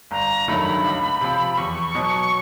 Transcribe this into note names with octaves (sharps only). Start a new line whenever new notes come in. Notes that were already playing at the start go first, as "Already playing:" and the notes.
G1 A#5
G2 D#3 F#3 A3 B5
C#2
C3 F3
E2 C#6
B2 F#3